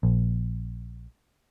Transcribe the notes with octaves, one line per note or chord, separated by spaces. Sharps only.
A#1